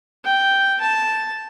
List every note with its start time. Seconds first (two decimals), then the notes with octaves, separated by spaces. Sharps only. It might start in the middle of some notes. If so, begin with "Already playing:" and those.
0.25 G5
0.81 A5